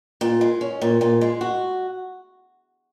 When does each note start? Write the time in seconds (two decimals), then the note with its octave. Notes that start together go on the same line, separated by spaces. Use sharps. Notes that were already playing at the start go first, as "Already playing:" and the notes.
0.21 A#2
0.41 G#3
0.61 C#4
0.81 A#2
1.01 A#2
1.21 G#3
1.41 F#4